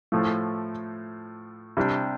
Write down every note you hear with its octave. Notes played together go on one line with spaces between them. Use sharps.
A2 F3 A3
C3 G3 D4